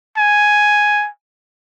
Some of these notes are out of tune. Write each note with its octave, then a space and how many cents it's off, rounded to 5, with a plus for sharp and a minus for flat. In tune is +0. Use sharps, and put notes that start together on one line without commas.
G#5 +5